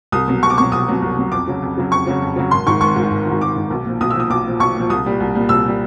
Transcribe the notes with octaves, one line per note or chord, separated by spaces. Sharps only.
C2 D#6
B2 F#3
C2 C#6
D6
B2 F#3 C#6
C2 D#6
B2 F#3
C2
B2 F#3
F2 D6
C#3 F#3
F2
C#3 F#3
F2 C#6
C#3 F#3
F2
C#3 F#3
G#1 C6
G#2 D#3 C#6
G#1 C#6
G#2 D#3
G#1
G#2 D#3
G#1 D6
G#2 D#3
B1
A#2 F3
B1 D#6
E6
A#2 F3 D#6
B1 D6
A#2 F3
B1 C#6
A#2
F3
C2 D#6
A#2 G3
C2
A#2 G3
C2 E6
A#2 G3